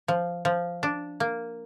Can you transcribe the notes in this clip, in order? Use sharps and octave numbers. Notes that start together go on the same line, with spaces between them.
F3
F3
D4
A#3